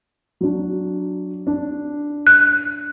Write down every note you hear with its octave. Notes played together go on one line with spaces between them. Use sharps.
F#3 D4
D4
F#6